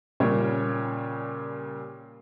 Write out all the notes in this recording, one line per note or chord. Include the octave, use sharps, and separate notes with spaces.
A#2 C#3 G3 C#5